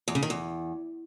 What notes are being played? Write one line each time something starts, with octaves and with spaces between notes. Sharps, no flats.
E2
C#3
D#3
E2